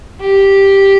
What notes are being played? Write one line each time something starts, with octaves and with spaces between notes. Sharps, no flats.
G4